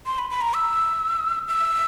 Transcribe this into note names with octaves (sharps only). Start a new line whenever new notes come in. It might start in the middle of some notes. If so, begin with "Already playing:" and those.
C6
B5
B5
A#5
E6
E6